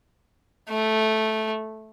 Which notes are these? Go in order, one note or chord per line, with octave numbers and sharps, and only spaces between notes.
A3